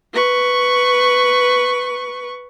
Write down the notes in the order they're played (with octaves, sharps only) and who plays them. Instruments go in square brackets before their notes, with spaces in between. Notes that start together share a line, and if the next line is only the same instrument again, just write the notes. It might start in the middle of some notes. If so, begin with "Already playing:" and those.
[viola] B4 C#6